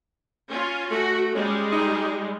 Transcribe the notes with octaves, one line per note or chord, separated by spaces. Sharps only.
C#4 F4
A3 F#4
G3 G#3 C#4
D#4